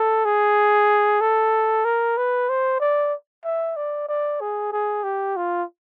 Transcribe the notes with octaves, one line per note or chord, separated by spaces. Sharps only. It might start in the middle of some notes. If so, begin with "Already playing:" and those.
Already playing: A4
G#4
A4
A#4
B4
C5
D5
E5
D5
D5
G#4
G#4
G4
F4